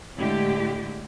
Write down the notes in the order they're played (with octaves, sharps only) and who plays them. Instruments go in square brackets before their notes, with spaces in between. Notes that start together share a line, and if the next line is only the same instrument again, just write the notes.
[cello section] A2 D3 G#3 E4 G4